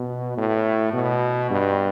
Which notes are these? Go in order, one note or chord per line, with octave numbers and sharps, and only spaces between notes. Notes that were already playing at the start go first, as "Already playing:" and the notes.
Already playing: B2
A2
B2
G2